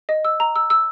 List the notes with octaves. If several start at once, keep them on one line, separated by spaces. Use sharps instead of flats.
D#5
E6
A#5
E6
E6